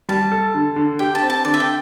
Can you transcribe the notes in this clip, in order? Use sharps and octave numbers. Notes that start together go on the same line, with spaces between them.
G3 A5
A4
D3
D3
G4 G5
A5
C4
A5
D3 D5
E5
G5